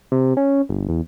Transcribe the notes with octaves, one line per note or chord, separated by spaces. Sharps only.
C3
C#4
G1
E2